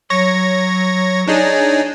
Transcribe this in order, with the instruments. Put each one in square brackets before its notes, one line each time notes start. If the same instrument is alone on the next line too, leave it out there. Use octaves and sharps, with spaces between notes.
[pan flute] F#3 [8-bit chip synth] C#5 C#6 A#6
[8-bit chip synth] D4 D#4 G#4 [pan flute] C#5